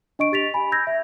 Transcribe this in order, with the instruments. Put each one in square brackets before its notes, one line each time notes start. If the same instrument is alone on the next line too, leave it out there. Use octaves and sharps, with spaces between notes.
[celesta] D4 D#5 C#6 D7
G4 A6 B6 F7
G#5 B5
E6 G6 G#6 A#6
E5